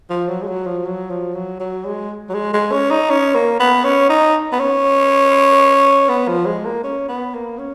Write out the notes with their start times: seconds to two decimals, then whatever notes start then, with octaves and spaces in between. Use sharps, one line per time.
0.10 F3
0.29 F#3
0.42 G#3
0.48 F#3
0.66 F3
0.85 F#3
1.10 F3
1.34 F#3
1.60 F#3
1.85 G#3
2.30 F#3
2.34 G#3
2.53 G#3
2.72 C#4
2.91 D#4
3.10 C#4
3.35 A#3
3.59 B3
3.84 C#4
4.09 D#4
4.52 B3
4.60 C#4
6.09 B3
6.28 F3
6.46 G#3
6.65 A#3
6.84 C#4
7.08 B3
7.34 A#3
7.58 C#4